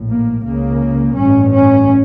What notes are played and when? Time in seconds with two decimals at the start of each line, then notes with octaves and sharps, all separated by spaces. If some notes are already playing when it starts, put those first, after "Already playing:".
Already playing: A#1 A2
0.09 A#3
0.45 C#2 C#3 A#3
1.16 A1 G2 C#4
1.52 C#4